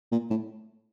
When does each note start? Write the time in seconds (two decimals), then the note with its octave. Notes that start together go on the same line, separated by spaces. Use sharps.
0.12 A#2
0.30 A2